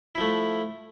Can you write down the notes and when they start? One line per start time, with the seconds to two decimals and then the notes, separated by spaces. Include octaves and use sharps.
0.15 E4
0.18 F3
0.21 A3